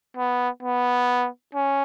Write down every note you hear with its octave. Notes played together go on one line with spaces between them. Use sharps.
B3
B3
C#4